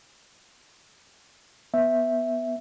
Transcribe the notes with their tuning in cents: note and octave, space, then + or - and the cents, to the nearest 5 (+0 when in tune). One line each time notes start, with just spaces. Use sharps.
B3 +0 E5 +0